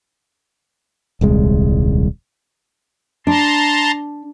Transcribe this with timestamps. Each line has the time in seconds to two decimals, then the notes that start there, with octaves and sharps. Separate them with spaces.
1.21 D#1 C2 G#3
3.27 D4 A5 A#5 C6